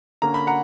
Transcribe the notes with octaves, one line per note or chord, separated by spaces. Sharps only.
D3 A#3 C#4 A#5
B5
F#5 A#5